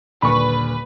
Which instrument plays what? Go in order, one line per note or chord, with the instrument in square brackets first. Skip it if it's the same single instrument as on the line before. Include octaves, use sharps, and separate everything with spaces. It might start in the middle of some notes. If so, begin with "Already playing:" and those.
[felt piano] D#1 A#2 D3 [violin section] B4 [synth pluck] B5 C#6